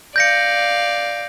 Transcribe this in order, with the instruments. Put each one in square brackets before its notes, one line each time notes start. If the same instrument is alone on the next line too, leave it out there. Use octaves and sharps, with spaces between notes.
[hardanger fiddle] D5 F5 [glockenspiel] G6 A#6 C#7